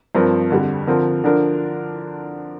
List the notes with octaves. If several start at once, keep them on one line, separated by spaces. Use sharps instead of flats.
G2 F3 C4 A#4
F2 D3 G3
D3 F3 C4 A#4
D3 F3 D4 A#4